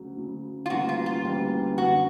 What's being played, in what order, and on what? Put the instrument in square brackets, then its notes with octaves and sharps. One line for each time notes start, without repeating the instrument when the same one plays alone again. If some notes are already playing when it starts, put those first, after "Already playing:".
Already playing: [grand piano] D2 C#3 F#3
D2 C#3 F#3
[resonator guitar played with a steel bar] F4
[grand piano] D2 C#3 E3 G3 A#3 [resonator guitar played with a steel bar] F#4
[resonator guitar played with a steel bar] F4
F4
[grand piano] D2 C#3 E3 G3 A#3
[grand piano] F#2 D3 F#3 B3 [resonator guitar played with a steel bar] F#4